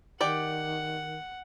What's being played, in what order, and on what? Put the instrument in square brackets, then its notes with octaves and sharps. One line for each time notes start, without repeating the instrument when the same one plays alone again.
[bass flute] D#3 [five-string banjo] G4 D5 [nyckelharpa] F#5